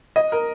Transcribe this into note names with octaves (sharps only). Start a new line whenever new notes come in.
D#5
A#4